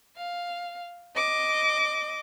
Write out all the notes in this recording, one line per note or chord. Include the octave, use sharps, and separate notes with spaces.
F5
D#5 D6